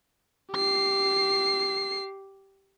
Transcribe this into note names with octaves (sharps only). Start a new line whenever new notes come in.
G4 C7